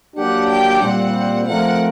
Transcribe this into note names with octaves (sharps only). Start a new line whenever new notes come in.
F#3 A#3 D4 G4 F#5
G5
A#2 G3 C4 F#5
F3 A3 C4 F4 A#4 F#5